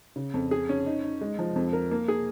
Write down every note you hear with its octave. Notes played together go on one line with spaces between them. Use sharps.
C#3
F2
G#4
C#4
D#4
D#4
G#3
F3
F2
A#4
A#3
G#4